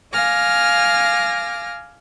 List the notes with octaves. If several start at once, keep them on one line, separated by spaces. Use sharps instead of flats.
F5 G#5 D6 F6 A#6